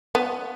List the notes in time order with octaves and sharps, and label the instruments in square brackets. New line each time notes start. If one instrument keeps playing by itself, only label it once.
[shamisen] B3